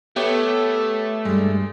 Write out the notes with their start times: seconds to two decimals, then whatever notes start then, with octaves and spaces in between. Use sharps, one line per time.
0.16 A3 B3 G4 C#5
1.25 G2 G3 G#3